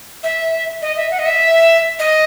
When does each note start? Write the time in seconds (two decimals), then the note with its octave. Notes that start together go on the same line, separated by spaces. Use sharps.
0.23 E5
0.82 D#5
0.97 E5
1.11 F#5
1.19 D#5
1.26 E5
1.99 D#5